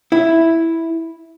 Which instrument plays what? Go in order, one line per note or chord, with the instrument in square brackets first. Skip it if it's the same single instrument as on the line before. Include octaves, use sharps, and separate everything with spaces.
[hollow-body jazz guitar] E4